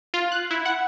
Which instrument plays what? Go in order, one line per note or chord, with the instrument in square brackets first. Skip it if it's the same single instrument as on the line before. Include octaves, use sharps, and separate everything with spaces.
[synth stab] F4
F#6
E4
F#5